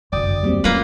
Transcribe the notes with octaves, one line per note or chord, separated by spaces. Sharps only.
G1 F#2 D3 D5 G5 D#6
D#2 F#3 G3 A#3 C4
F#3 A#3 C#4 E4 F4 B4